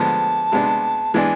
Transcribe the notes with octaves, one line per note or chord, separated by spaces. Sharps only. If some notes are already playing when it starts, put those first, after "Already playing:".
Already playing: D3 F3 G#3 B3 A5
C3 G#3 B3 D4
E3 G#3 B3 D4 G#5 A5